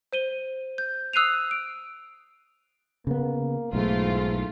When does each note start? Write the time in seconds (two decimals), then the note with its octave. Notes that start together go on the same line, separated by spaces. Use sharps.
0.13 C5 D#7 G7
0.78 G6
1.13 D#6 E6 F#6 C7 D#7 F7
1.51 D7
3.07 C#3 A#3 B3
3.73 B1 G#2 E3 A3 F4